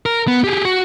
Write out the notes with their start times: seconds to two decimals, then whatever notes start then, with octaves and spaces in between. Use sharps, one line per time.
0.06 A#4
0.28 B3
0.44 G4 G#4
0.65 F#4